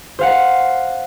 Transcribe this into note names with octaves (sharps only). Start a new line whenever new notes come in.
C5 F5 F#5